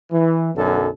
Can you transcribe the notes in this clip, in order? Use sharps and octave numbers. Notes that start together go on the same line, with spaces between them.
E3
B1 F#2 D3 A4